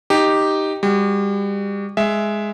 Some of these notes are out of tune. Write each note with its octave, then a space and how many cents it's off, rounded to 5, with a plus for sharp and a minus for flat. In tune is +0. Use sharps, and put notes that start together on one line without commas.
D#4 +0 G4 +0
G3 +35 F#4 +30
G#3 +0 E5 +5